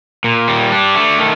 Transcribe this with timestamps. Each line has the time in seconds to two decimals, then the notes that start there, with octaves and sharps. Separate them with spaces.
0.24 A#2
0.48 G3
0.72 D4
0.95 A3
1.19 D#3